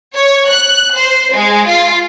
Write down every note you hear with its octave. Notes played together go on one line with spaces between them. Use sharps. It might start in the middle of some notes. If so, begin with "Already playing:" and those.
C#5
F#6
C5
G#3
F4